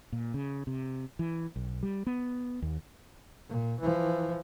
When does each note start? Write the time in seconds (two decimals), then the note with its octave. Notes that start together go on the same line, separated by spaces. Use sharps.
0.12 A#2
0.34 C#3
0.67 C3
1.19 E3
1.56 B1
1.83 G3
2.07 B3
2.62 D#2
3.49 A#2
3.80 E3 F3